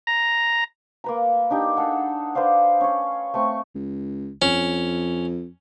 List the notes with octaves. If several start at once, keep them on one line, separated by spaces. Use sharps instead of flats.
A#5
A#3 B4 A#5
D4 D#4 G4
G#4 A4 F#5
B4 C5 D5 F5
C#4 C#5
A3 C4 C#6
C#2
F2 C#4